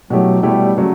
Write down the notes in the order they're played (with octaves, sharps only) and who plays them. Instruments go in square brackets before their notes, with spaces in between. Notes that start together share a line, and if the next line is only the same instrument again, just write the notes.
[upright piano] B2 A3 E4 G4 [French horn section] F#3
[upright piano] B2 A3 E4 G4 [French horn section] G3
[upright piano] C#3 F#3 A3